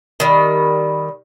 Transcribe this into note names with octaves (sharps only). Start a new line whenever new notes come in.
D#3 G3